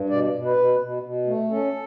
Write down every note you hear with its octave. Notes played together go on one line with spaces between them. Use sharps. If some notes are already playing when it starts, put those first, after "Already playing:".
Already playing: G2
B2 D5
B2
B4
B2
B2
B2
A3
C#4 A4